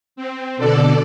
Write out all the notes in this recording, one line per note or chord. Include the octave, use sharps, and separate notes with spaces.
C4
B2 D3 A4 D5